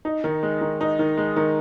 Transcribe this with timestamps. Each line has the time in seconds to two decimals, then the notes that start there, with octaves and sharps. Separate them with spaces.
0.05 D#4
0.24 D#3
0.43 G#3
0.61 D#3
0.81 D#4
0.99 D#3
1.18 G#3
1.36 D#3